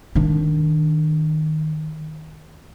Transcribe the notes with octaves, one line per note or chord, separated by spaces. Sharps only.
D#3 D4